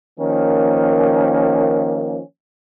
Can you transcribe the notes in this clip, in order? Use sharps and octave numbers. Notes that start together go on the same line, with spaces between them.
D#3 F3 A#3 C#4